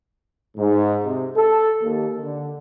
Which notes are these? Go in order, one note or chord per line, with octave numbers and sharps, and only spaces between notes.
G#2
C3
A4
D#2
D3